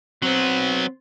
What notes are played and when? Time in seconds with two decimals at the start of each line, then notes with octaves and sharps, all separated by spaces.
0.22 F#3 B3 C4 C5